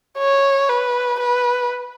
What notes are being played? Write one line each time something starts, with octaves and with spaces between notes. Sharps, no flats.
C#5
B4
B4